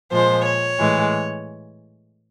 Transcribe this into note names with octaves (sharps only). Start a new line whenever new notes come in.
A#2 F3 G#3 C5
C#5
A2 E3 G#3